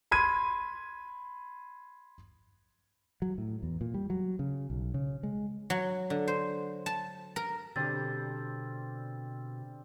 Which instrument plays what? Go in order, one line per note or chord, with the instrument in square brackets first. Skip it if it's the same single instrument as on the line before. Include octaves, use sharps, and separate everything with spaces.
[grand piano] B5 C6 G#6 D#7
[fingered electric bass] F#3
A2
E2
A#2
G3
F#3
C#3
B1
C#3
G#3
[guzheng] F#3
D3
C5
A5
A#4
[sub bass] B2 [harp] D3 [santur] G3 C4 [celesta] A6